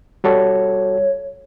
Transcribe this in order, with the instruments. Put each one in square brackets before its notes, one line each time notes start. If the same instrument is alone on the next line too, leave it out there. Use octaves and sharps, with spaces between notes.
[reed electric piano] G3 F#4 A4 [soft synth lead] C#5